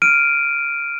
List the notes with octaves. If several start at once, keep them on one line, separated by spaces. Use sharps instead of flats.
F6 D7 D#7